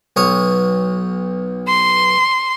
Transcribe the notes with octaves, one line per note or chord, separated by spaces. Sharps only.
B1 C#5 D#6
C6